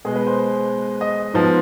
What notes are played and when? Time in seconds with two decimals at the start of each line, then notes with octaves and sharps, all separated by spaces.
0.05 B2 G#3 B3 G#4
0.16 B4
0.27 C5
1.01 D#5
1.34 G#2 F3 B3